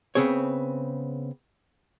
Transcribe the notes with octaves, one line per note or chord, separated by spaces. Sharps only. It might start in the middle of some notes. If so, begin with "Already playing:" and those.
C#3 B3 C4 G#4 C#5